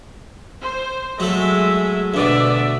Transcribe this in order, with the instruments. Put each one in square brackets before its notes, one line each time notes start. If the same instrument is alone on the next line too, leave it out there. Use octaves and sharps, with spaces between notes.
[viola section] C5
[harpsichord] F#3 A3 [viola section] G#3 E5
[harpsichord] D2 B2 [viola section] D5 E5